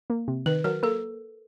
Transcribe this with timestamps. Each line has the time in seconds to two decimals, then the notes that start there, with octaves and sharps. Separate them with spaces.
0.10 A#3
0.28 C3
0.46 D#3 B4
0.64 F#3 A#4
0.83 A#3 A4